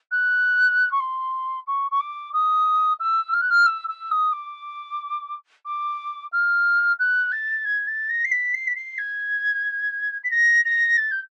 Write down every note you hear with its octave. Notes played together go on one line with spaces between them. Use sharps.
F#6
C#6
C6
C#6
C#6
D6
D#6
E6
F6
F#6
F6
E6
E6
D#6
D6
D6
F6
F#6
A6
G#6
A6
A#6
C7
B6
C7
B6
C7
G#6
B6
A#6
A#6
A6
G6